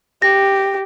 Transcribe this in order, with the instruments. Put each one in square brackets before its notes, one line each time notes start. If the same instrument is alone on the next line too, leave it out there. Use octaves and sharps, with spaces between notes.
[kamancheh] G4 [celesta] A#6